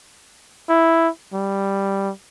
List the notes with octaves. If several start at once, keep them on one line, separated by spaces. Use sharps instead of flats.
E4
G3